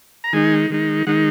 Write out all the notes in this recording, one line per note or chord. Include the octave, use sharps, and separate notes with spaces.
A#5
D#3 G#3 D#4 G#5
D#3 G#3 D#4
D#3 G#3 D#4 F#5